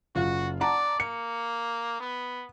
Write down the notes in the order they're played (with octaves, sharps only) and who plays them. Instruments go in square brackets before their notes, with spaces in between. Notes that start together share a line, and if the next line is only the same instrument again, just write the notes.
[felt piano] F#1 F4 [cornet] F#4
[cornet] D5 [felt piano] F#5 A5 A#5
[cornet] A#3 [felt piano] C#7
[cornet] B3